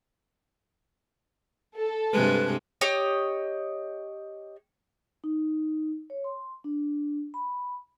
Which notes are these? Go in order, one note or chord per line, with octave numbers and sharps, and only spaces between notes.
A4
G2 C3 G#3 B4
G4 C#5 D#5
D#4
C#5
C6
D4
B5